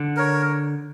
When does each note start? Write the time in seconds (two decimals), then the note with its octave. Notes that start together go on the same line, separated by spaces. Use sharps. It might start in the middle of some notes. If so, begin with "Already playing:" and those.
Already playing: D3
0.17 A#4 C#5